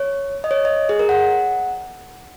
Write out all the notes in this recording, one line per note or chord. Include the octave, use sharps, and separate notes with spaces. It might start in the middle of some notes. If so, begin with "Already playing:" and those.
Already playing: C#5
D#5
C#5
D#5
G#4
A#4
F#5